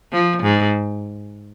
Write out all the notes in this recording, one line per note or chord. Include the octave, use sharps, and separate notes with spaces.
F3
G#2